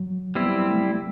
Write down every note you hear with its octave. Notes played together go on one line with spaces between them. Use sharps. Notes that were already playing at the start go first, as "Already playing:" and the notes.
Already playing: F#3
G3 B3 C4 E4
A3